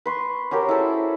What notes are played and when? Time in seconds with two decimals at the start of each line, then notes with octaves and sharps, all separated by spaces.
0.06 B4 C6 C#6
0.51 C#4 F#4 G4 A#4
0.69 E4 G#4 A4 C5